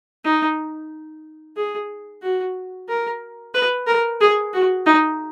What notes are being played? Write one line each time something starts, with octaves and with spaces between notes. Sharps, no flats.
D#4
G#4
F#4
A#4
B4
A#4
G#4
F#4
D#4